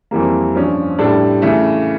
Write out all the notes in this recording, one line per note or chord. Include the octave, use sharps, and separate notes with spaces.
F2 E3 G3 A#3
G2 F3 C#4
A2 G3 D4 A4
C#3 E3 A3